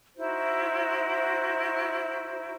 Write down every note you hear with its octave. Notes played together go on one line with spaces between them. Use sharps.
D#4 E4 F#4 C5